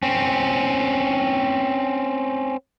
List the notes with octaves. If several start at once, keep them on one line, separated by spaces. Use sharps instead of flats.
C4 C#4